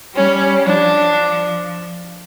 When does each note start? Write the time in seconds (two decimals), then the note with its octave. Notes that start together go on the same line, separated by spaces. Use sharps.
0.16 G3 C#4
0.65 F3 D4